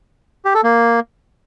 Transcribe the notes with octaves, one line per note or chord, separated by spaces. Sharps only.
G4
A4
A#3